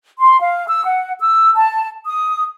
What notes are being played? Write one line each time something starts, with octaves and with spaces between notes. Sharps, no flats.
C6
F5
E6
F#5
E6
A5
D#6